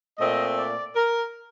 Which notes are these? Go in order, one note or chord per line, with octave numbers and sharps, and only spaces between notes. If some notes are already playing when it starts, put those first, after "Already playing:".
A#2 A3 C4 D#5
D5
A#4